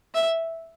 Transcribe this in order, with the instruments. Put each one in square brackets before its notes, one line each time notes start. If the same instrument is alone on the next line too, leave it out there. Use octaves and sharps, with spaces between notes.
[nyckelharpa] E5